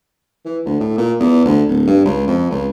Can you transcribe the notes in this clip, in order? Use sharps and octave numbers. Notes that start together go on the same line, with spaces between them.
E3
D2
A2
A#2
E2
D2
D1
G2
C#2
F2
C#2